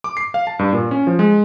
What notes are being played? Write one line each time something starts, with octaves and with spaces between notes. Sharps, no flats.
D6
C7
F5
A5
G2
A#2
C#4
F3
G#3